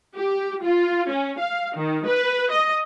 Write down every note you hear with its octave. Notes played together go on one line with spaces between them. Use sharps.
G4
F4
C#4
F5
D#3
B4
D#5